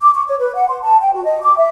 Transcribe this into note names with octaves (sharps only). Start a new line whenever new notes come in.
D6
C#6
C#5
B4
F#5
C6
A5
G5
F#4
D#5
D6
E5